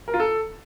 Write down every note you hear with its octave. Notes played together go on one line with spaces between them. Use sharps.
A#4
F4
A4